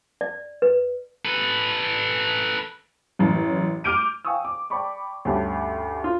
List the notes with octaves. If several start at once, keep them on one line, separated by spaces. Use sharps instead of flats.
D5
B4
A4 B4
A1 F#2
D6 F6 G6 D7 D#7
F5 G5 G#5 C#6 D#6 E6
D6
D5 G5 A5 B5 C#6 D6
D2 G2 C#4 G4 A5
F4